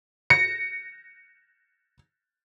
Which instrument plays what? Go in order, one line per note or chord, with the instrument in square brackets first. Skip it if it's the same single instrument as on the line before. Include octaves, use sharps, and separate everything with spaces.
[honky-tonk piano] A#6 C#7